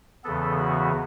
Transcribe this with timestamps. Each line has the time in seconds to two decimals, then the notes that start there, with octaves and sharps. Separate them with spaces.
0.24 E2 C#3 E3 B3 A4
0.59 F#4